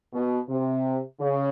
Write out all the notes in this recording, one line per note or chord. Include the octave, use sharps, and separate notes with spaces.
B2
C3
C#3